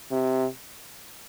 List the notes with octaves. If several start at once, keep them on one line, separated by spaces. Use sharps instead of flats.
C3